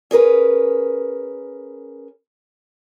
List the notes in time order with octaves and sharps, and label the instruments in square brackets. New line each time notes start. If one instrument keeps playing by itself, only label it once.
[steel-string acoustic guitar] C#4 G#4 A#4 B4